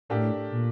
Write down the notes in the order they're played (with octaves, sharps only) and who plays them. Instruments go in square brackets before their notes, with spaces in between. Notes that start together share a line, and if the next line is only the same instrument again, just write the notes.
[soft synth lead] A2 [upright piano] A3 D4 G4 A#4
[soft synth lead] A#2